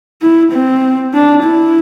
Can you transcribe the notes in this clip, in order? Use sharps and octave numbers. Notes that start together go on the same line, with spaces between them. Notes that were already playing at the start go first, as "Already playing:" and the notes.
E4
C4
D4
E4